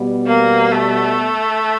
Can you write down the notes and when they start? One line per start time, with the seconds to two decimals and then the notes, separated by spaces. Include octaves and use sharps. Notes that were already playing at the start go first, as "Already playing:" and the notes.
Already playing: B2 G3 B3
0.27 A#3
0.71 A3